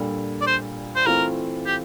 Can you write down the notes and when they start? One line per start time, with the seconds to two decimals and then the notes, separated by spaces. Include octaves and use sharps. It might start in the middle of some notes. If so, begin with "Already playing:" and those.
Already playing: A#2 G3 D4 A4
0.41 D5
0.47 C5
0.96 C5
1.06 E3 A3 C4 F4 A#4
1.66 G4